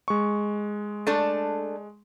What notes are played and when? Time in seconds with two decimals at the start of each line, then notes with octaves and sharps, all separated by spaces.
0.08 G#3 C#6
1.07 A3 D4 A4